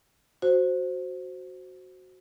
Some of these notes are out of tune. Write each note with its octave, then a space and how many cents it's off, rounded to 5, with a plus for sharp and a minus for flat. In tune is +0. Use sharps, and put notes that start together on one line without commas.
F#4 +0 C5 +0